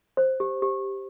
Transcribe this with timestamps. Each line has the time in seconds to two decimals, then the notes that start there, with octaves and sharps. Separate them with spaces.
0.17 C5
0.40 G4
0.62 G4